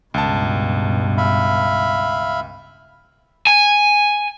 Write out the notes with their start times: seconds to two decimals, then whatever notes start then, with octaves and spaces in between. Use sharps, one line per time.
0.14 C#2 G2 B2 A5
1.18 E5 F5 B5
3.47 G#5